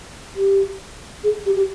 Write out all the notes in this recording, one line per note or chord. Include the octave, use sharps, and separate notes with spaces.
G4
G#4
G4
G4